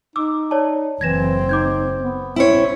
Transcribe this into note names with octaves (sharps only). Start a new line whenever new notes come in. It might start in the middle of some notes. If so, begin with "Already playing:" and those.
D#4 D6 E6
C#5 D5 A5
F#1 E3 C4 G#6 A#6 E7
D#4 D6 G6 G#6
B3
C4 C#4 E4 C#5